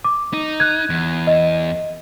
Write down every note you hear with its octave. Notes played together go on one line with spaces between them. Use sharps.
D6
D#4
F#6 G#6
E2
D#5